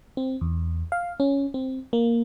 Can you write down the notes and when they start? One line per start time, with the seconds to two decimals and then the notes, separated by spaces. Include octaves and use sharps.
0.17 C4
0.41 E2
0.92 F5
1.20 C#4
1.54 C4
1.93 A#3